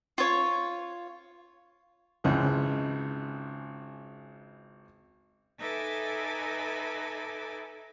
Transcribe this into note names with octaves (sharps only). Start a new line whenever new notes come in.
F4 C#5
G#1 C#2 E3
D#4 A4 B4 E5 G#5 D6